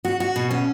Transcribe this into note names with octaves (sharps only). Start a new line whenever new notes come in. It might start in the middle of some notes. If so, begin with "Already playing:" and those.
F#4
F#4
B2
C#4